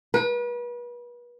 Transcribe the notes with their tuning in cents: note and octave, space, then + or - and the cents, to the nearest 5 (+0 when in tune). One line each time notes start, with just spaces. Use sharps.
B4 -35